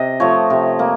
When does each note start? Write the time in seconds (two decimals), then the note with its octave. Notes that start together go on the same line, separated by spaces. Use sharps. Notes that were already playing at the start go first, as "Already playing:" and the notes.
Already playing: C3 D#5
0.20 F3 A3 C#5
0.50 C3
0.79 A#3